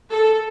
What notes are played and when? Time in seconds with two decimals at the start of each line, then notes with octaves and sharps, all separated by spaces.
0.12 A4